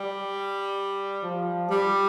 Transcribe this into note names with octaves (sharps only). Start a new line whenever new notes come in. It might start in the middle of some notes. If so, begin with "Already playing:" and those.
Already playing: G3
F3
G3